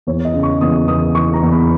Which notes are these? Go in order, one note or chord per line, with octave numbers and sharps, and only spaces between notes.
E2 C#5
D#5
C#3
C#6
E2 D#6
E3 D#6
E3 C#6
A#5
E2
B5